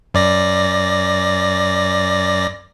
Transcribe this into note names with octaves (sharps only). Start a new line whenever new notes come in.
F#2 D5 A#6